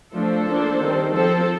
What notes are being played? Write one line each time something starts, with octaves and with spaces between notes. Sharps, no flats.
F3 A3 D4 A4 C5
F3 A#3 D4
D#3 G3 C4
F3 C4 A4 C5